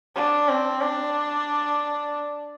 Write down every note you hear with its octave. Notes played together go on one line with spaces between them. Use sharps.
D4
C4
D4